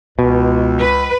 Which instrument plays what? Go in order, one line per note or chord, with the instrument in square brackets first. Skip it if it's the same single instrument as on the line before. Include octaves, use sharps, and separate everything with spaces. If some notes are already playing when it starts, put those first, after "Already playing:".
[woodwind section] C#2 [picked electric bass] B2
[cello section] B4